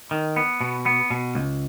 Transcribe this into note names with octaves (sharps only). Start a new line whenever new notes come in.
D#3
B3
B2
B3
B2
C#2